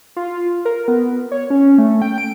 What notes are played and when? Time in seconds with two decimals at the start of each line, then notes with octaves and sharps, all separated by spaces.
0.17 F4
0.65 A#4
0.88 B3
1.32 C#5
1.50 C#4
1.78 A3
2.02 G5
2.18 D7